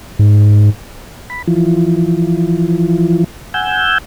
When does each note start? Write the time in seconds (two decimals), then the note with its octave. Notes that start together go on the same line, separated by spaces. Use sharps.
0.19 G#2
1.30 B5
1.48 E3 F3
3.54 F#5 G#5 E6 G6